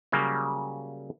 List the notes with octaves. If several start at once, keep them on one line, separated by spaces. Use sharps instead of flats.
C#3 F#3 G3 A#3